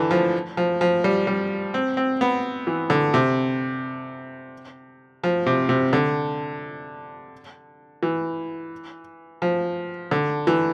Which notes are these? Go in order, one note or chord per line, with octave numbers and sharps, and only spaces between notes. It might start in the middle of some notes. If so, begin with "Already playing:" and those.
Already playing: D3 E3
F3
F3
F3
G3
G3
C4
C4
B3
E3
D3
C3
F3
C3
C3
D3
E3
F3
D3
E3